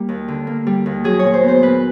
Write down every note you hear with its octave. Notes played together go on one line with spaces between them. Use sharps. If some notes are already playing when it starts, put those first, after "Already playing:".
Already playing: G3 A#3
D#2
D3
A#3
G3
D#2
F#3 G#4
A#2 C#5
C5
B3
C5
A#2 B4